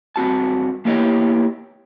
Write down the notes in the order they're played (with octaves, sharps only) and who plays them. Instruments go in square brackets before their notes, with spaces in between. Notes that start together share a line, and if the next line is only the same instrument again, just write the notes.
[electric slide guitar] G2 C4 F#4 A5
A#3 B3 E4 G4 C#5 D#5